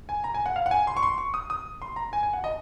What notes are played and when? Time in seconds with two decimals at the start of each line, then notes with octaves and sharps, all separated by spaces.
0.09 G#5
0.24 A#5
0.34 G#5
0.46 F#5
0.56 F5
0.66 F#5
0.71 G#5
0.87 C6
0.97 C#6
1.03 C6
1.18 C#6
1.34 D#6
1.50 D#6
1.82 C6
1.96 A#5
2.13 G#5
2.23 G#5
2.33 F#5
2.44 D#5